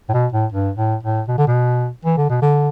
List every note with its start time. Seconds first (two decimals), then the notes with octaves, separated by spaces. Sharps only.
0.09 A2
0.13 B2
0.32 A2
0.52 G2
0.77 A2
1.03 A2
1.28 B2
1.38 D3
1.47 B2
2.05 E3
2.17 D3
2.29 B2
2.42 D3